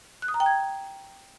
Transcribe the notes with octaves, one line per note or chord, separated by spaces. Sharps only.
F#6
D#6
A#5
G5
G#6